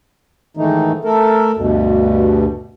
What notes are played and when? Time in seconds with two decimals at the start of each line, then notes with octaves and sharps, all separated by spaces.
0.57 G#2 D#3 E3 A3 D#4
1.04 A3 A4 A#4
1.57 D2 G2 B2